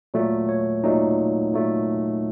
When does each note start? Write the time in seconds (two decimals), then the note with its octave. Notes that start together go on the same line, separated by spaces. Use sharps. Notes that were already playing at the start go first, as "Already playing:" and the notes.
0.14 A#2 F#3 A3
0.49 C#5
0.84 A#2 F#3 A3 D#4
1.54 A#2 F#3 A3